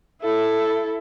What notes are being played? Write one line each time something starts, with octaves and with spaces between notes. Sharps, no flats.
E4 A4